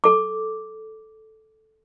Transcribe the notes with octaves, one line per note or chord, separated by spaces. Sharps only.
A4 D6